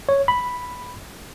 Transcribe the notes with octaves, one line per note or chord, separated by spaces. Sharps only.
C#5
B5